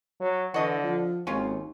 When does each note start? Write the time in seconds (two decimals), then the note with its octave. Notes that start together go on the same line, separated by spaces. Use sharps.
0.21 F#3
0.54 D3 E3 F#4 D#5
0.83 F3
1.27 G#1 D#2 C#4 F4